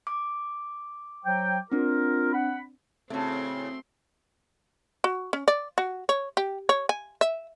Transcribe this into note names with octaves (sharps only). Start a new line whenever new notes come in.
D6
F#3 C5 G5
C4 D4 F4 A#4
F#5 B5
A2 C#3 A3 C4 F#4 C6
F#4
C#4
D5
F#4
C#5
G4
C#5
G#5
E5